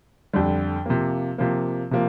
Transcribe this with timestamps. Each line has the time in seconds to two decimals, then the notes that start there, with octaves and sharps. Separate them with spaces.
0.33 F2 D3 G3
0.86 C3 F3 A#3
1.38 C3 F3 A#3
1.91 C3 F3 A#3